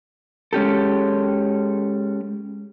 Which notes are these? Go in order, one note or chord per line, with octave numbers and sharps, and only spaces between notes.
G#3 C#4 G4 A4